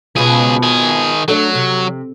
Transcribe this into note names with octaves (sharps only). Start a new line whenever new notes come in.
C#2 B2 F3 G#4
D#3 G#4
F#3 A3 D4
C3